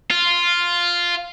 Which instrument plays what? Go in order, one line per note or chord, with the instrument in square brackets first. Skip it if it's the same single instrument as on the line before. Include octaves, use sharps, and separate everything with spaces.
[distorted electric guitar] F4